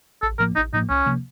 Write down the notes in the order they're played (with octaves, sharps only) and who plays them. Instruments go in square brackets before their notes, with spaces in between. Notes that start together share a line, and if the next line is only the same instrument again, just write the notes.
[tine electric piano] A1 [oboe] A4
[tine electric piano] A2 F3 A#3 [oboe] A#4
[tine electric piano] A1 [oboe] D#4
[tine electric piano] A2 F3 A#3 [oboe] D#4
[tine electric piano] C2 [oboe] C#4
[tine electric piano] C3 F3 A#3